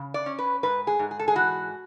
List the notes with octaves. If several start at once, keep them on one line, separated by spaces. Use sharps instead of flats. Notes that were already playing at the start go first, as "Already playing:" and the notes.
Already playing: C#3
D5
C#4
B4
G#2 B4
G#4
G#2
G#4
A4
G#4
E3 F#4